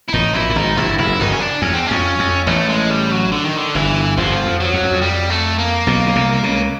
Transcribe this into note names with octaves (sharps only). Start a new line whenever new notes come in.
E4
A1 A2 D#4
A#1 A#2 E4
A2
G#1 G#2 D#4
G1 G2 E4
F#1 F#2 E4
F#1 F#2 D#4
C#4
D4
E2 C#4
C4
F2 C#4
F2
A1 A2 A3
G#3
G3
F#3
D3
D#3
D3
G1 G2 E3
G1 G2 F3
F2
F#3
F2
F#2
F2
G3
A3
A#3
B1 B2
C#3
C2 C3
C#2 C#3